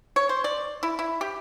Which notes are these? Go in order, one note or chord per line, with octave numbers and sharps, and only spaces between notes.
C#5
C5
D5
E4
E4
G4